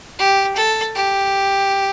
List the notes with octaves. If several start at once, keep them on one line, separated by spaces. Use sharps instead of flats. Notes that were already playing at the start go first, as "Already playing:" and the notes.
G4
A4
G4